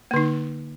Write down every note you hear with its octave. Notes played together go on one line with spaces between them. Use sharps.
D3 A#3 D#4